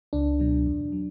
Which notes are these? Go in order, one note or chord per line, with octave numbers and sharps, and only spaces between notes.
C#2 D4
B2 F#3
E2
F#3